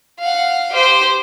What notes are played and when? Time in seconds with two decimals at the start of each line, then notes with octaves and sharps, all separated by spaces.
0.20 F5 F#5
0.73 G4 C5